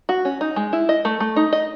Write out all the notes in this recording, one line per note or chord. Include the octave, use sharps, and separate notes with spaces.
F#4
C#4
D#4
G#3
E4
D#5
A3
A3
D#4
D#5